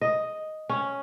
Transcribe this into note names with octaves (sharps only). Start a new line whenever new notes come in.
D#5
C#4